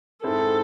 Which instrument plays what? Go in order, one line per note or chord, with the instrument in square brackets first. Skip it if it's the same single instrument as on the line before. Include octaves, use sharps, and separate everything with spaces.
[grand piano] G#2 G#3 C4 E4 [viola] A4